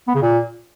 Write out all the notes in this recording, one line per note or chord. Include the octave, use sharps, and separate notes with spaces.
B3
C#3
A#2